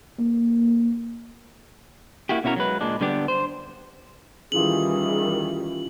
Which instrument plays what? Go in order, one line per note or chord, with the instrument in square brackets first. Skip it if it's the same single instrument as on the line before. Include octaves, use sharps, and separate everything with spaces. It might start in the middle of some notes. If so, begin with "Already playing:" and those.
[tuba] A#3
[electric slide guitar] A#3 E4 F#4 G4
B2 C#4 E4 F#4 A#4
F#3 G#3 B4
A#2 G#3 D4
D3 G3 B3 D4 G4
C5
[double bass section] D#3 E3 G3 [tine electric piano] C#4 E4 F4 [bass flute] G#4 [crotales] F#7